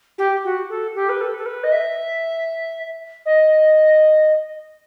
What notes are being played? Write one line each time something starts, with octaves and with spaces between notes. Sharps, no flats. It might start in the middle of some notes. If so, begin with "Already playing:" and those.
G4
F#4
A4
G4
B4
A4
A4
B4
D#5
E5
D#5